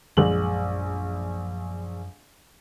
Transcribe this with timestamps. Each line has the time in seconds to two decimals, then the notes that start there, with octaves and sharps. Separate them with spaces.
0.17 A#1 F#2 G#3 F#7